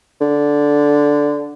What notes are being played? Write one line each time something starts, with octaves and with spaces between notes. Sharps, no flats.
D3